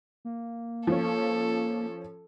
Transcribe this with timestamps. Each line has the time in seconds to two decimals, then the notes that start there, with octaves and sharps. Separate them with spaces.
0.25 A#3
0.87 F3 C#4 A4